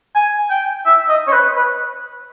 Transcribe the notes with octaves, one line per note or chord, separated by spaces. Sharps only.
G#5
G5
E5
D#5
C#5
B4
B4